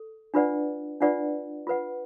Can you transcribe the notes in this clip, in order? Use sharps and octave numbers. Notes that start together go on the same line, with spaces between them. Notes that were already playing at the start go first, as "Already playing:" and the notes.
Already playing: A4
D4 F4 B4 D5 F#5
D4 F4 B4 D5 F#5
F4 B4 F#5